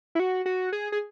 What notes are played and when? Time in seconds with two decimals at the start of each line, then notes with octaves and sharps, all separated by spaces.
0.15 E4
0.19 F#4
0.46 F#4
0.73 G#4
0.92 G#4